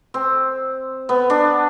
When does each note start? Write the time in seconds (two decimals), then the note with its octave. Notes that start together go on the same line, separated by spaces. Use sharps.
0.14 C4
1.09 B3
1.30 D4